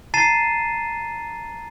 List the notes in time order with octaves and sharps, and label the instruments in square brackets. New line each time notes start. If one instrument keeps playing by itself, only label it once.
[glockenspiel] A5 A#5 A6 C7 D#7 E7